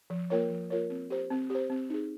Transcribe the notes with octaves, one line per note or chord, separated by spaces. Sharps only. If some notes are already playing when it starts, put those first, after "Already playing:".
F3
A#3 F4 A#4 C#5
F3
A#3 F4 A#4 C#5
C4
G4 C5
C4
G4 C5
C4
D#4 G#4